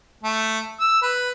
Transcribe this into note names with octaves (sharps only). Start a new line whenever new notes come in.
A3
E6
B4